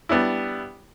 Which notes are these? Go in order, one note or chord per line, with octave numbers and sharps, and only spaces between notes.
G3 B3 D4 E4